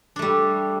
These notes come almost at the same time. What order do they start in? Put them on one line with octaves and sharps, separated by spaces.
D4 A3 G3